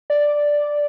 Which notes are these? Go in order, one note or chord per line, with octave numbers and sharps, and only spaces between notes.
D5